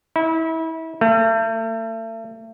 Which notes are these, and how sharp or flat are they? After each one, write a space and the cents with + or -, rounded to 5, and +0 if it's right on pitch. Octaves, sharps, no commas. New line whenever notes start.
E4 -30
A3 +40